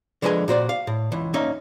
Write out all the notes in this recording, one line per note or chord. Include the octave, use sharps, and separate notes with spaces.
D3 F3 G#3 B4 D#5 G#5
A#2 F#4 C5 D5
F5
A2
C#2 E3
D2 A#3 C#4 D#4 E5